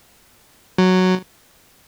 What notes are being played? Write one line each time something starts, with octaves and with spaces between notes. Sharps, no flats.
F#3